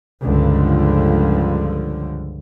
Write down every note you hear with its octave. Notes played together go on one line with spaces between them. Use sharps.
C#2 G2 D3 F3